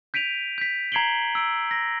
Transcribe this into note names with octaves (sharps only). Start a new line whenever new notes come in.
G6 B6 D7 D#7 F7
G6 B6
A#5 G#6 C7 D7 F#7 G7
E6 D7
A#6